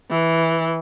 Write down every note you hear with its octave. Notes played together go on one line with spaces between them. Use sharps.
E3